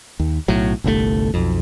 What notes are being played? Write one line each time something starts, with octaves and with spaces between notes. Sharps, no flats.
D#2
B1 A2 F#3
G1 C2 A#2 A3
B1 F2